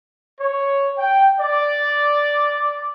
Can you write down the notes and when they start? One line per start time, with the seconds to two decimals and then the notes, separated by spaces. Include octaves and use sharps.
0.41 C#5
0.97 G5
1.40 D5